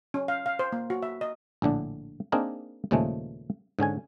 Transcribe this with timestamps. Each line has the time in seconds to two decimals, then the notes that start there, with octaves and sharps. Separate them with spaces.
0.14 C#4
0.28 F5
0.46 F5
0.59 C5
0.72 A#3
0.90 F#4
1.03 E5
1.21 D#5
1.62 A#1 A2 D3 D4
2.32 A#3 C4 D4 D#4 G#4 A#4
2.91 D#2 A#2 C#3 F3 G#3 A3
3.79 G#2 D3 C#4 G#5